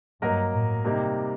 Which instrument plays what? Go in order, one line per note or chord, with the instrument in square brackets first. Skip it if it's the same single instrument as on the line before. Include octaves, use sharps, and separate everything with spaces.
[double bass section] G2 [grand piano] F#3 A#3 F#4 A#4 D#5
[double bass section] A2
[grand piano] C3 G3 A#3 D#4 G4